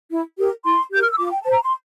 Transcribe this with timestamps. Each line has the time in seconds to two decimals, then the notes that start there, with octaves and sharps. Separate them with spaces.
0.11 E4
0.38 G4 A#4
0.65 E4 C6
0.91 G4 A#4 G6
1.02 F6
1.11 E6
1.18 F4 D6
1.31 G5
1.41 C5 A5
1.52 A#5
1.63 C6